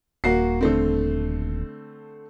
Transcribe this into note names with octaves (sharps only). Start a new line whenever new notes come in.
D#1 A#3 F#4 C7
D3 A3 C4